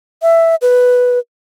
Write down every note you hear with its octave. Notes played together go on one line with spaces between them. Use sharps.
E5
B4